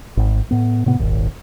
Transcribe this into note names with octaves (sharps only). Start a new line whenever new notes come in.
G#1
A2 B3
A2 C3 B3
D#1 G#1 D#2